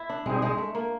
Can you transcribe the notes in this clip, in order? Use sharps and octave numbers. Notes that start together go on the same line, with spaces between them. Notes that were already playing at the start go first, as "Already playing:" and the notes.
Already playing: E4
D4
B2 G3 G#3 C4 D#4 G#4
G#3
A3
A#3